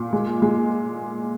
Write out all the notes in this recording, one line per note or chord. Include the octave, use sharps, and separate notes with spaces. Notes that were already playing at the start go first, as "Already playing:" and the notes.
Already playing: A#2
G#3
G#3